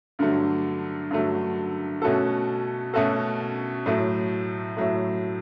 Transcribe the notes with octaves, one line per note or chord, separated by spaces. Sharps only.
G2 D3 F#3 A3
G2 D3 F#3 A3
B2 A3 C#4 F#4 A4
B2 A3 C#4 F#4 A4
A2 F#3 A3
A2 F#3 A3